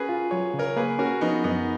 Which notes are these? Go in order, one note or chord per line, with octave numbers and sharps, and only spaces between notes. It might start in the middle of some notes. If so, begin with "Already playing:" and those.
Already playing: C#4 F#4 G#4 A#4 B4
F4
F#3 C#5
C#3
A#4 C#5
A#3 G#4 B4
C#4 F#4 A#4
F3 B3 D#4
F#2 B3 D#4